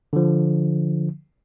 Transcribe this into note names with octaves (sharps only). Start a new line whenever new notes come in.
D3 F3